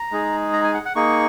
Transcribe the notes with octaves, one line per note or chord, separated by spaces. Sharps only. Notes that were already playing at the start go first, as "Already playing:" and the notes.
Already playing: A#5
G#3 D#4 G#4
A#5
G#5
F#5
F#5
A#3 D#4 G#4 C#6